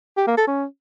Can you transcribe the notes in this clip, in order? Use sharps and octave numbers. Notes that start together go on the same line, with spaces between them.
G4
A#3
A4
C#4